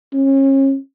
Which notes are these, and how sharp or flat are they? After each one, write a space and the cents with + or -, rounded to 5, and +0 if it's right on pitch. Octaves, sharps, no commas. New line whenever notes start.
C#4 -35